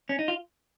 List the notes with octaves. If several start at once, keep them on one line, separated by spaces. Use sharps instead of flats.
C#4
D#4
F4